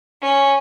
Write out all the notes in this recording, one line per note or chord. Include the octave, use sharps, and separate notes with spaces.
C#4